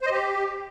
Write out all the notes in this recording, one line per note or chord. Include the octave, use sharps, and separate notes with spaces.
C5
D#5
G4